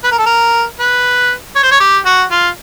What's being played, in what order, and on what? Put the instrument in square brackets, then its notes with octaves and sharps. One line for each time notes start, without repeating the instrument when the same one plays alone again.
[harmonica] B4
A#4
A4
A#4
B4
C#5
C5
C#5
G4
F#4
F4